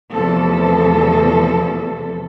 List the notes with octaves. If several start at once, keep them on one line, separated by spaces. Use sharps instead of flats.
E2 C3 E3 F3 A3 A4